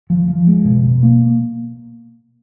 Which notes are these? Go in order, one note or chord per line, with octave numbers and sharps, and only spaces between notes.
F3
F3
G#3
B2
B2
A#3